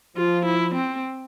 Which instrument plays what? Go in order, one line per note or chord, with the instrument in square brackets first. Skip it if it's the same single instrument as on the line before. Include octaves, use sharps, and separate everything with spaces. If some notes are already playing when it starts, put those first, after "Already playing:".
[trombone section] F3 [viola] F4
[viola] E4
C4